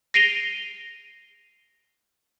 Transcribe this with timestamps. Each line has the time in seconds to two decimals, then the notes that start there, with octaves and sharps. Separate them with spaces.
0.14 A#6 C7 D7 D#7 F7 G7